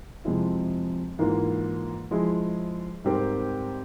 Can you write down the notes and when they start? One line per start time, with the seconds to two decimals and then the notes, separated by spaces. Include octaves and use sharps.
0.25 F2 C3 F3 G#3 E4
1.19 G#2 E3 A#3 F4
2.11 F3 G#3 E4 G#4
3.04 G#2 G3 C4 G4 A#4